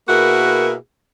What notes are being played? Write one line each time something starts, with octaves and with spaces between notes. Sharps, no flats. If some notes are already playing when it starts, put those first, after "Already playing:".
B2 A#3 E4 F#4 G#4 A#4